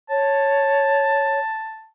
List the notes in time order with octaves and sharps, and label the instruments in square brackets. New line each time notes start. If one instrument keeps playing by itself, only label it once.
[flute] C#5 [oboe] A5